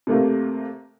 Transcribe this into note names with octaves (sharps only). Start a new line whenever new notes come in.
C3 A3 A#3